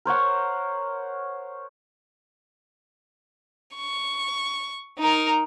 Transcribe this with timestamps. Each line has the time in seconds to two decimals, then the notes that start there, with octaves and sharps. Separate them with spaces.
0.05 A#4 C5 C#5 F#5
3.76 C#6
4.99 D#4 A#4